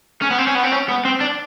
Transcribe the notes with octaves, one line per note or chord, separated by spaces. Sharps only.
C#4
B3
C4
C#4
B3
C4
C#4
B3
C4
D4